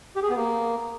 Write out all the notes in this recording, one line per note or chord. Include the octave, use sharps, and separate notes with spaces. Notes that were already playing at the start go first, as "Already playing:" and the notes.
G4
G#4
B3
A#3